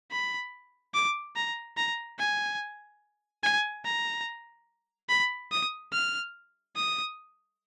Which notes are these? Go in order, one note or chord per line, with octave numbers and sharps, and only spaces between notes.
B5
D6
A#5
A#5
G#5
G#5
A#5
B5
D#6
F6
D#6